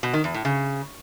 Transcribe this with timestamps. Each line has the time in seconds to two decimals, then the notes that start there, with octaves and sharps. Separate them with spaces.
0.03 B2
0.13 D#3
0.24 E2
0.34 A2
0.45 C#3